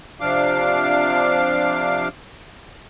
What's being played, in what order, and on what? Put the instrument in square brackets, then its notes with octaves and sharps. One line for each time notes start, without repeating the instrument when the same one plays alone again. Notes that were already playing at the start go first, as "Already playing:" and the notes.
[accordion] C3 F3 D4 F5 D6